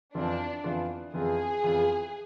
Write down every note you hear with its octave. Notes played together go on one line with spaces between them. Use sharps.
F2 E3 B3 D4 F4
F2 E3 B3 F4
F2 E3 B3 F4 G#4
F2 E3 B3 F4